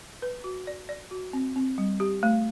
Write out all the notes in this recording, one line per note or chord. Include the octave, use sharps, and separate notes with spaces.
B4
F#4
D5
D5
F#4
C4
C4
G3
G4
A3